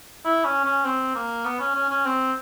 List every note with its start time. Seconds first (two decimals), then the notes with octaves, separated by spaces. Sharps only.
0.24 E4
0.45 C#4
0.64 C#4
0.85 C4
1.15 A#3
1.45 B3
1.60 C#4
1.75 C#4
1.90 C#4
2.05 C4